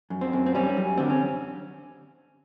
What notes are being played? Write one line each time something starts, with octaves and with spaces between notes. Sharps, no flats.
F#2
C4
F#2
C4
G3 C#4
F#2
D3 C4
C#4